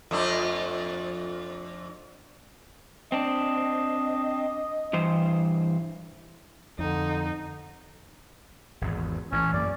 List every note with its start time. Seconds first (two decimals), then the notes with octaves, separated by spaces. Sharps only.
0.11 F2 A3 D4
3.12 C4 D4 D#5
4.93 G2 E3 C5
6.79 F2 D3 D#4
8.81 G#1 E2
9.32 A1 E3 C#4
9.53 F#2 A#3 D5